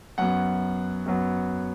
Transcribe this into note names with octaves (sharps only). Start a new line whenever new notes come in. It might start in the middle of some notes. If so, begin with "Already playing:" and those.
F#2 F#3 B3 F#5
F#2 F#3 B3